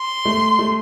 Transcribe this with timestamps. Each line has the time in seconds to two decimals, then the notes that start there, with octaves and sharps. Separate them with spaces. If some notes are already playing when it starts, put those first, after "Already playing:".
Already playing: C6
0.25 A3
0.59 A3